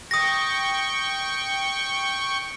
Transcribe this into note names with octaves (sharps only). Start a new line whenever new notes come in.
G5 C#6 D#6 A#6